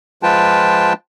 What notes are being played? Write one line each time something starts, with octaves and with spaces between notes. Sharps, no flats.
F3 G#3 F4 B4 G5 A5